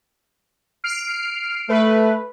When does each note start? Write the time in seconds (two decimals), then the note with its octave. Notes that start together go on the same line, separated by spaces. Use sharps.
0.84 F6 C7 D7
1.69 A3 B4